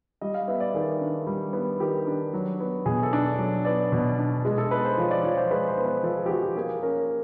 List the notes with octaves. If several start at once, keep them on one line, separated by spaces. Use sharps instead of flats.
G3 D#5
F5
B3 E5
D5
D#3 G#4
D4
G3
B3
D#3 G4
D4
F#3
B3
B2 G#4
A4
D4
F#3
B3 D5
B2
D4
G#3 G#4
A4
B3 B4
C5
F3 C#5
D5
F3 C#5
C5
G#3 B4
C5
B3
B4
F3 A4
G#4
G4
F3 F#4
G4
A#3 G#4
C#4 A#4